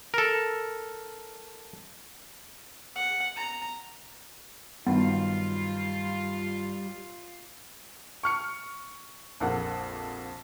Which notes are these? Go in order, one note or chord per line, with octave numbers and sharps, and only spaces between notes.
A4 A#4
F#5
A#5
G2 D#3 F#3 G3 B3 F4
C#6 F6 C#7
A#1 F2 A#3 F#5